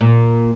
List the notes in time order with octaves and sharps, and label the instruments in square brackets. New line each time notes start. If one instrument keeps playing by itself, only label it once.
[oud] A#2